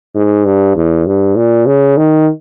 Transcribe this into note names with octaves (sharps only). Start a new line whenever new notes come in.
G#2
G2
E2
G2
A#2
C#3
D#3